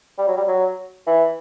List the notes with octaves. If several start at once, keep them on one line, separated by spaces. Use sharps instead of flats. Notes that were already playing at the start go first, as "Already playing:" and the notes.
G3
F#3
G3
F#3
E3